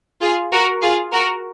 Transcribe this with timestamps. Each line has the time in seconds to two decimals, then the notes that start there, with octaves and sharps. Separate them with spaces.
0.21 F4 G#4
0.52 F#4 A#4
0.82 F4 G#4
1.12 F#4 A#4